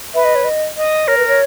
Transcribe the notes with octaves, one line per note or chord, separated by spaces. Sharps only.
B4 E5
D#5
C#5
D#5
D#5
A#4 C#5
B4
C#5